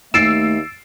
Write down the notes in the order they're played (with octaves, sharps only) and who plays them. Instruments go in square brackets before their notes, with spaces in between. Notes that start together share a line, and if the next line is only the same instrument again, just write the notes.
[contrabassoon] D#2 [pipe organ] A3 [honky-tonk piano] E6 C7 [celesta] A6 D7 E7